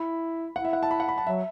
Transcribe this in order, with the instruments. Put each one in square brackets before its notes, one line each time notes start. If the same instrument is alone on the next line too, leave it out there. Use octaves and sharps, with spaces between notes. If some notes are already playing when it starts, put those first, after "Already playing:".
Already playing: [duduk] E4 [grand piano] B5
[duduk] E4 [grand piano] F#5
[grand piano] E5
F#5
A5
B5
F#5
B5
A5
[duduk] F#3 [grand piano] E5